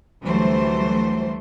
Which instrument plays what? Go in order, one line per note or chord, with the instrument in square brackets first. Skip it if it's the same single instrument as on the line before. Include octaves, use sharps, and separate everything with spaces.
[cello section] D2 E3 F#3 G3 A3 C5